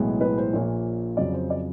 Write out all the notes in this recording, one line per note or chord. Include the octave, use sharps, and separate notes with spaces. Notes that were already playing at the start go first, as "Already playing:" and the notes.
Already playing: B1 A2 E3 G#3 B3
B4
C5
A#1 A#2 F3 A#3 C#5
F2 C#3 F#3 D5
C5
D5